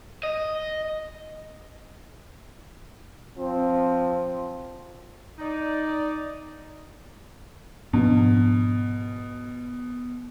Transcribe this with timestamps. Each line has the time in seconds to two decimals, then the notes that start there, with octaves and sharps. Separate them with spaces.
0.23 D#5
3.37 F3 C4
5.39 D#4 D5
7.93 G#2 B2 F3 D4